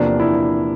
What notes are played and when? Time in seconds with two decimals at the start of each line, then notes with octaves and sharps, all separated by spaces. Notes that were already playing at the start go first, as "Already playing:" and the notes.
Already playing: E2 C3 F3 A#3 D4
0.20 E4